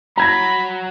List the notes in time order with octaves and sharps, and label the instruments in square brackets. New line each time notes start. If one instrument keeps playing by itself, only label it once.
[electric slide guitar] F#3 [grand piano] A#5 G#6 A#6 [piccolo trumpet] B5